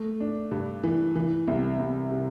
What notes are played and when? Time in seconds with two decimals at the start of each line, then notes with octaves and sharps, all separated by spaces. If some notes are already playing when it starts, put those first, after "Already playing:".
Already playing: A3
0.20 D4
0.51 G2
0.83 E3
1.15 E3
1.47 C2
1.79 C2
2.11 C3